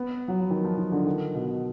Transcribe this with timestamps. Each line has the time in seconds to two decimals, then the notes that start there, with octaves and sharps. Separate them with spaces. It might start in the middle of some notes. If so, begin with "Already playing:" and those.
Already playing: B3
0.28 F#3
0.40 F3
0.50 D#3
0.64 F3
0.78 D#3
0.92 D3
1.06 D#3
1.35 B2